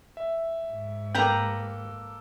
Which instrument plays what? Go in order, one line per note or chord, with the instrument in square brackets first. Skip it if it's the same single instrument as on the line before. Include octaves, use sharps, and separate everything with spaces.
[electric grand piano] E5
[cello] G#2
[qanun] A#3 B4 A#5 [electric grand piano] A4 D6 [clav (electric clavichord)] G5